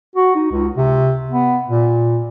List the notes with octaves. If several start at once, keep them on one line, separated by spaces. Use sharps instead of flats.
F#4
D#4
C#2
C3
B3
A#2